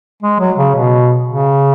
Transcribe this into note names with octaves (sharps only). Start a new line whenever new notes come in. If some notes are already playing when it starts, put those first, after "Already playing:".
G#3
F#3
C#3
B2
C#3